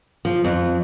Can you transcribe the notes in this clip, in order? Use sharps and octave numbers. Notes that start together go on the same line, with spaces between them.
F3
F2